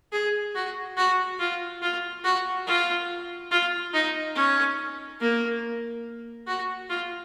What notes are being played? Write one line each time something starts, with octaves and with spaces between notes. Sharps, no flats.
G#4
F#4
F#4
F4
F4
F#4
F4
F4
D#4
C#4
A#3
F#4
F4